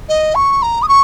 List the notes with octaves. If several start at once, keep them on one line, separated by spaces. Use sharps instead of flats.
D#5
C#6
A#5
D#6
C#6